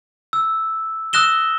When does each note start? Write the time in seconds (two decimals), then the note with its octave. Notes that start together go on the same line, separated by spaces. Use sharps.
0.33 E6
1.13 D#6 E6 F#6 A#6 E7 G7